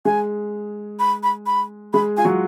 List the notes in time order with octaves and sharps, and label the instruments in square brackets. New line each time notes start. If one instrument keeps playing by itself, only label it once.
[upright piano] G#3 G#4 [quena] G#5
[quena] B5
B5
B5
[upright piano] G#3 G#4 [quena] B5
[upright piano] F4 [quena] G#5
[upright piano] F#3 F#4